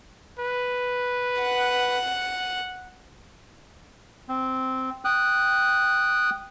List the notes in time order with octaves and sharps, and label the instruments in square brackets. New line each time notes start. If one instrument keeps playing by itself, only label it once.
[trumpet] B4
[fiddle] F#5
[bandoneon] C4
G5 D#6 F#6